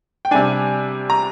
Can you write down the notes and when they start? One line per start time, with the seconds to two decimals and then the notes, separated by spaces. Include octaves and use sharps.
0.25 G5
0.31 C3 G3 D4 G#5
1.10 A#5